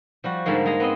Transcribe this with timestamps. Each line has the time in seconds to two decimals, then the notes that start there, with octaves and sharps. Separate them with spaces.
0.24 F3 G3 F#4
0.46 G#2 D3 G3 G#3 A#3
0.65 G#3 G#4 A#5
0.80 B3 C4 D#5